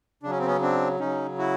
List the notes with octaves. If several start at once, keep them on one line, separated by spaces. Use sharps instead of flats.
C#3 F#3 C#4 D4
C4
B3 C#4
C4 D4
C#3 F#3 C#4 D#4
E4 F#4